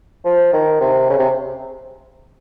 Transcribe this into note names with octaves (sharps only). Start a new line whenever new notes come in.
F3
D#3
C3
C#3
C3